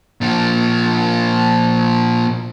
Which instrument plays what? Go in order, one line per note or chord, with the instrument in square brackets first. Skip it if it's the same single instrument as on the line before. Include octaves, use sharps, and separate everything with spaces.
[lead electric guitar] A#2 F3